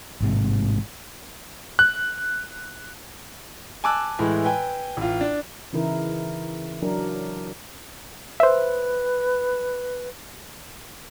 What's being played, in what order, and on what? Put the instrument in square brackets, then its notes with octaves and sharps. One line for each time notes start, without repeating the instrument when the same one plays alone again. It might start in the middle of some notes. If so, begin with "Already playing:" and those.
[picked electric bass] A1 G#2 C3
[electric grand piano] F#6
[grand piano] G#5 A5 D6 E6 F#6
A2 E3 G#3
B4 G5 G#5
A1 F4
D4
[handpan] C#3 E3 D#4 E4 A#4
F#3 D4 A#4
[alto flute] B4 [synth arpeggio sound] C5 E5